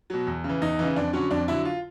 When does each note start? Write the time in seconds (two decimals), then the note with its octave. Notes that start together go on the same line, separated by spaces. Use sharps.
0.10 B2 F#3
0.27 E2
0.44 C#3
0.49 E3
0.62 E2 D#4
0.79 C#3 E3
0.96 F2 D4
1.13 D3 F#3 C#4
1.31 F2 D4
1.48 D3 F#3 E4
1.65 F4